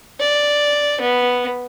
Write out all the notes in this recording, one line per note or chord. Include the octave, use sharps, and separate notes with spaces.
D5
B3